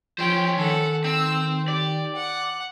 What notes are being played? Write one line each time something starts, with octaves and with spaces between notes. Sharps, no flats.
F3 C#4 C5 G5
D#3 A4 F#5
C4 E6
G4 D5
F#5